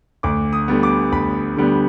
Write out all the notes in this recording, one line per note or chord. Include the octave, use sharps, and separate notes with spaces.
D2 D6
D#6
D3 G3 B3
D6
D2 B5
D3 G3 B3